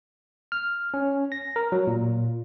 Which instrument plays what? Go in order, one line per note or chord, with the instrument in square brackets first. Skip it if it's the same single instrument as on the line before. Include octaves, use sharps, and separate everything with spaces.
[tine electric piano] F6
C#4
A#6
A#4
F#3
A#2